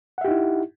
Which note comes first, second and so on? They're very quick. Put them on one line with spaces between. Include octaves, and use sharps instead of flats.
F#5 E5 G4 D#4 E4